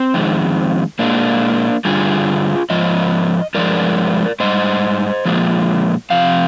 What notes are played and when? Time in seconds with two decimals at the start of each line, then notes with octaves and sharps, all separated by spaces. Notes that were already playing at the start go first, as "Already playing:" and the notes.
Already playing: C4
0.14 F2 D#3 G#3
0.99 A#2 G#3 A#3 D4
1.85 G2 D3 G3 F4 G#4
2.70 G#2 F3 D#5
3.55 G2 F3 G#3 A#4 D5
4.40 G#2 G3 C5 D#5
5.25 A#2 F3 G#3
6.10 C3 F3 F5